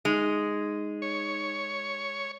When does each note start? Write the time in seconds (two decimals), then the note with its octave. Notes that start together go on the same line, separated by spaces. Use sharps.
0.05 G#3 D#4 D#7 F7
1.02 C#5